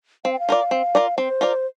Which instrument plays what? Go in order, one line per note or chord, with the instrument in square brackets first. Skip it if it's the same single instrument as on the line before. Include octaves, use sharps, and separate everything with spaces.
[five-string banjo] C4 [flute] F5
[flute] G5
F5
[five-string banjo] F4 A#4 D5
C4
F4 A#4 D5
[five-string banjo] C4 [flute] C5
[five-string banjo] F4 A#4 D5